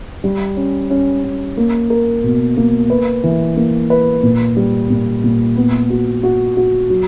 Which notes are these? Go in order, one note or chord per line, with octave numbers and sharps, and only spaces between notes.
G3
C#4
C#4
C#4
A#3
A#4
B2
A#3
B4
E3
A#3
B4
A#2
G3
A#2
A#2
B3
F#4
F#4
F#4
F#3